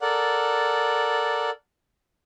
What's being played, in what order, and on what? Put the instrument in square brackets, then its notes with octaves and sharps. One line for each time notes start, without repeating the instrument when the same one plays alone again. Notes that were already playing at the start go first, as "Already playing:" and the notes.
[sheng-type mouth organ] A4 A#4 D5 F#5